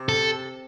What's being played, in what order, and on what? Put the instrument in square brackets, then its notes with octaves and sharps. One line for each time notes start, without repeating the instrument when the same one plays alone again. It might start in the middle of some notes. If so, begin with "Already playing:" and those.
Already playing: [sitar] C3
[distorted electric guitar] A4